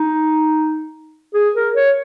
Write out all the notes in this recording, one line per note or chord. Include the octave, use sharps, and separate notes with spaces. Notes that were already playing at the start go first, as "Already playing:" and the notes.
Already playing: D#4
G#4
A#4
C#5